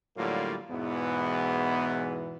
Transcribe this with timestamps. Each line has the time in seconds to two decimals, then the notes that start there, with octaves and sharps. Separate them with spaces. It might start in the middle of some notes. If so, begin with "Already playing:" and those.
0.17 A2 D3 F#3 G3 A#3 F4
0.70 E2 G#2 B2 E3 B3